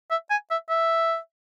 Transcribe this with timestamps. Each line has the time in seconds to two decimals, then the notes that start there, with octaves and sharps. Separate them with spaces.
0.11 E5
0.30 G#5
0.51 E5
0.69 E5